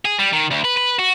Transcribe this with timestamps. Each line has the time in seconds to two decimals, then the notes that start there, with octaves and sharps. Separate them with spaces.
0.05 G#4
0.19 G3
0.33 D#3
0.51 D2
0.64 B4
0.77 B4
0.99 F#4